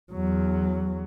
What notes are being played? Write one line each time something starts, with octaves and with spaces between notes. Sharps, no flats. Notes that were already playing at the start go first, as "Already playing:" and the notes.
E2 F#3